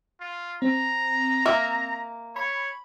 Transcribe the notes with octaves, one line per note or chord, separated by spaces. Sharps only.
F4
C4 A#5
A#3 E5
C#5 B5